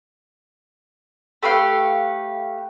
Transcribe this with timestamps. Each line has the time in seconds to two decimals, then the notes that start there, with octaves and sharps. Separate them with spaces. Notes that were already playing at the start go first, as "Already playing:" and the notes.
1.43 A3 G4 B4 F5